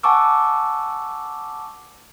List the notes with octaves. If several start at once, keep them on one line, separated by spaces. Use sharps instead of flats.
F#5 G#5 A5 C#6 D6 E6